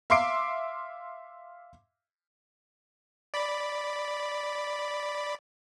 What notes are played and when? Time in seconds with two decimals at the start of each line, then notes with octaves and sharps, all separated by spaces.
0.10 E5 F5 C6 D6 C7 D7
3.34 D5 B5